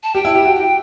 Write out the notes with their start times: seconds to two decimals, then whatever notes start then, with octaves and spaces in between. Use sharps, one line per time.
0.03 A5
0.15 G4 G5
0.25 E4
0.35 G4
0.45 F#4
0.55 G5